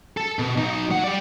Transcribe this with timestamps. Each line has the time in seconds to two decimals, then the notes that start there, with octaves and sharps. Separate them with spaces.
0.17 A4
0.39 B2
0.57 B1 D#4
0.90 F#3 F#5
1.04 G4 D5